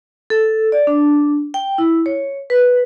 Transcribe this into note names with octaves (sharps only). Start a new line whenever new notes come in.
A4
D5
D4
G5
E4
C#5
B4